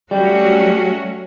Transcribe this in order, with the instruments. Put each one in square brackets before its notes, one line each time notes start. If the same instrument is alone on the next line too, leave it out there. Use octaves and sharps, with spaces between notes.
[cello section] F#3 A3 C#4 F#4 [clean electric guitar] G3